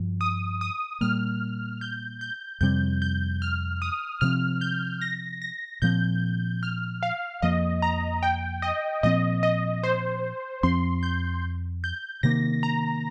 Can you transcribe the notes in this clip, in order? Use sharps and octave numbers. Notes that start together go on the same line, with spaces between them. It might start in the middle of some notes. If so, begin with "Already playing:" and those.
Already playing: G2 F3
D#6
D#6
A#2 G3 A#3 F6
G6
G6
F2 C3 G3 C4 G6
G6
F6
D#6
C3 F3 C4 F6
G6
A#6
A#6
A#2 F3 C4 G6
F6
F5
F2 F3 A#3 D#5
A#5
G5
D#5
A#2 F3 C4 D#5
D#5
C5
F2 F3 C4 C6
G6
G6
C3 D#3 A#3 A#6
A#5